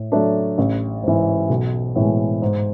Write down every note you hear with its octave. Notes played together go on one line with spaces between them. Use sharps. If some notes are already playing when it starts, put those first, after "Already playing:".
Already playing: A2
F#3 A3 D4
A1
G#2 E3
B1
A2 E3 G#3 B3
G#2